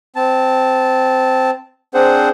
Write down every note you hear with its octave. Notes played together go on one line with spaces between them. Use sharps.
C4 A5
C4 D4 G#4 C5 F#5